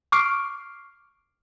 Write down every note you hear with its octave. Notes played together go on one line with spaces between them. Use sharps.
C#6 D6 F6 C7 D7